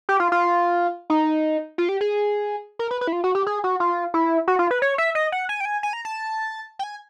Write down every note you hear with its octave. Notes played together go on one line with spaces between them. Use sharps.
G4
F4
F4
D#4
F4
G4
G#4
A#4
B4
B4
E4
F4
F#4
G4
G#4
F#4
F4
E4
F#4
F4
B4
C#5
E5
D#5
F#5
G#5
G5
G#5
G#5
A#5
A5
G5
G#5